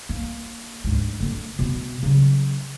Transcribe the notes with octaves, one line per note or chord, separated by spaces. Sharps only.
A#3
D2 G#2
D3 C4
B2 C4
C#3 F#3